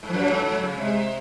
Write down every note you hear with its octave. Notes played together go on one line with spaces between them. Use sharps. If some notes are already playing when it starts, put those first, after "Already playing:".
G#2
F3
F#2 F#3
G#2
G#2
C#3
C3 G#3